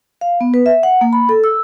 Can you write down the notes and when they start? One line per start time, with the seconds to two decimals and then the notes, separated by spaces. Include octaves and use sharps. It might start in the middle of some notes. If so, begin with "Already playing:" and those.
0.21 F5
0.41 B3
0.54 B4
0.66 E5
0.83 F#5
1.01 A#3
1.13 B5
1.29 A4
1.44 E6